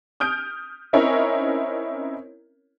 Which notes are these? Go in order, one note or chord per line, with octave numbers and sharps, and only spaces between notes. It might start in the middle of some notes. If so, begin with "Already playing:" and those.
D#6 F6 G6 D7
C4 C#4 D#4 E4 A#4 C#5